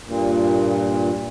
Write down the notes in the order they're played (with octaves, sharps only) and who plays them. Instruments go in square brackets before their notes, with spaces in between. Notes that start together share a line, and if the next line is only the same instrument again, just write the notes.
[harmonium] G2 A#2